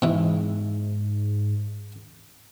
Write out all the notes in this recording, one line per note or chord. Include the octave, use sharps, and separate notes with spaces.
G#2 B2 E3